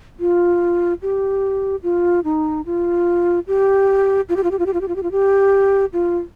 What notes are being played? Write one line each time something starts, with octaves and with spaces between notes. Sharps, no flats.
F4
G4
F4
D#4
F4
G4
F4
G4
F4
G4
F4
G4
F4
G4
F4
G4
F4
G4
F4